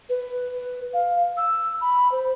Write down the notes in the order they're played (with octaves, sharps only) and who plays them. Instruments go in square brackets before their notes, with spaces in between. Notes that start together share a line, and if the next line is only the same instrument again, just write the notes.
[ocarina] B4
F5
E6
B5
C5